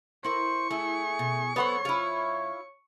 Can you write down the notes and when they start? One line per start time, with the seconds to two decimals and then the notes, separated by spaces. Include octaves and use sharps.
0.24 E4 A#4 C5 C#6
0.71 A3 E4 G#4
1.19 B2
1.56 F#2 B3 A4 C5 C#5 F#5
1.85 E4 F4